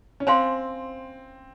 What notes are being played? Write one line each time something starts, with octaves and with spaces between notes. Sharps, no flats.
C#4
C4 C5 F5 G#5 C6